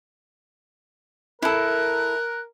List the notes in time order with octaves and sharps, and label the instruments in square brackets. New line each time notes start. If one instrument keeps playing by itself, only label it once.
[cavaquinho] E4 A4 [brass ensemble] A#4 [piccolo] F#6